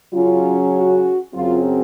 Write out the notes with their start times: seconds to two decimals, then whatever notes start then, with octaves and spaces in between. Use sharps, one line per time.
0.12 C#3 F#3 C#4 F4
0.73 F#4
1.34 F#2 C#3 F#3 C4 F4